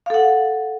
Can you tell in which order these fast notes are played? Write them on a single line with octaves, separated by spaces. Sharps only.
F5 A4 F#5